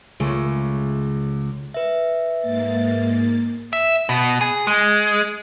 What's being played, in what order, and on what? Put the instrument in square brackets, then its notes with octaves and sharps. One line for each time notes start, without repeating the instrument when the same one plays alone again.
[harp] C#2 C#3 A3
[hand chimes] B4 E5
[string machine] G#2 A#3 A6
[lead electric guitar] E5
B2
G#4
G#3